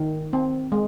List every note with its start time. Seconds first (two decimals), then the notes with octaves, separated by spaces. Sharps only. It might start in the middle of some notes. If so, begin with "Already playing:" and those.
Already playing: D#3
0.33 C4
0.72 G#3